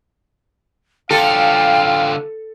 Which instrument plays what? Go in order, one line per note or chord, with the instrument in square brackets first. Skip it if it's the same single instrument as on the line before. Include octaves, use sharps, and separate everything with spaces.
[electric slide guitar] D3 F4 [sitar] A4 [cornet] F5 [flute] G5